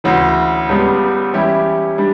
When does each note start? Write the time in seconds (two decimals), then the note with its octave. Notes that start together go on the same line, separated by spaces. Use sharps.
0.04 D2 C#3 E3
0.69 C#2 C#3 G3 B3
1.33 E3 G3 C#4 E4 G4
1.98 G3 D4